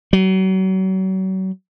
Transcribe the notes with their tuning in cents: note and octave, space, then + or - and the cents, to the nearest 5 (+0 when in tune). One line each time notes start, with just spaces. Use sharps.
F#3 +35